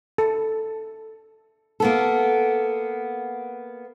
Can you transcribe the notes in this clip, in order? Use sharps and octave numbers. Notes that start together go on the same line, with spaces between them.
A4
A#3 B3 A4